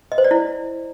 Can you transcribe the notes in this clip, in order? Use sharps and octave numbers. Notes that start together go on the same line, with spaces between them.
D#5
C5
D5
E4